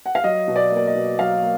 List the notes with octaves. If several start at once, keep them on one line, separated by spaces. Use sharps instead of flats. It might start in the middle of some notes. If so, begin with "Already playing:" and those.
F#5
F5
F#3 D#5
B2
D5
A#3 D5
D#5
B2
F#3 F5
A#3